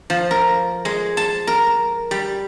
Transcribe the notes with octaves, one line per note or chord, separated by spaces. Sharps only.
F3
A#4
G#3
A5
A#4
G3